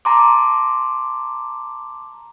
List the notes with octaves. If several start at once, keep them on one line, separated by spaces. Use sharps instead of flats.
A5 A#5 C6 D6